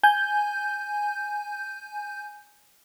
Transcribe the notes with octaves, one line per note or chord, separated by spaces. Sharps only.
G#5 G6